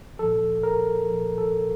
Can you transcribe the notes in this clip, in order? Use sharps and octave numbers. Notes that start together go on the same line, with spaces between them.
A#2 F3 A4
A#4
A#2 F3
A4